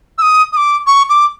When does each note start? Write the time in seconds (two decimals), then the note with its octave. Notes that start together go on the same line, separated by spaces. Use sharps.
0.18 E6
0.22 D#6
0.53 D#6
0.57 D6
0.87 C#6
1.10 D6